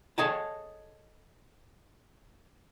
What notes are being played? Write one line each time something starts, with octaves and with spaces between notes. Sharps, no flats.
G#4 A4 C#5 D#5 G5 A5